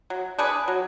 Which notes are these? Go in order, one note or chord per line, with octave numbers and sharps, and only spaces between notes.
F#3
D4 G#4 B4
F#3